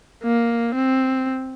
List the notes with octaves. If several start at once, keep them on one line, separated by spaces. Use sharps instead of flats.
A#3
C4